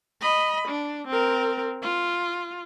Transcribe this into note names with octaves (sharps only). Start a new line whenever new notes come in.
D#5 B5
D4
C4 A#4
F4